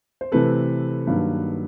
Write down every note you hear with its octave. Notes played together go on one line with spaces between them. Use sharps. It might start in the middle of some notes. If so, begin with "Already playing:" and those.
C5
C3 E3 A3 C4 A4 B4
G2 D#3 F#3 A#3